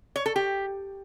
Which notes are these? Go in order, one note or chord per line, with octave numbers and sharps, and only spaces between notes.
C#5
A4
G4